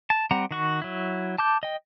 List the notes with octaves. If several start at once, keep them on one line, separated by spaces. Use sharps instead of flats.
A5
G3 C4 F#5 A#5
D#3 F#4 C#6
F#3 E4
A5 D6 G6
D#5 G5